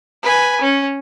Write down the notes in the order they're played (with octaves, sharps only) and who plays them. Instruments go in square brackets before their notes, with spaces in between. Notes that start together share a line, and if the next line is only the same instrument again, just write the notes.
[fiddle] B4 G#5
C#4